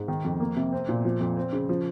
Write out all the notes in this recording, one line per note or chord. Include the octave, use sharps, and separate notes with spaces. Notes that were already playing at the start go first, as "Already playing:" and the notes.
Already playing: G#2
D#3
F2
A#3
C3
C4
A#2
F3
F2
C4
C#3
F3